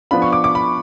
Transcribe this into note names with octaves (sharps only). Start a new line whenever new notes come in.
F3 B3 D4 F4 B5
C#6
D6
D6
B5